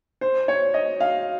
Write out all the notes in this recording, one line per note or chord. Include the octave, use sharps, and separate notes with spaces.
C5
C#5
D#5
F5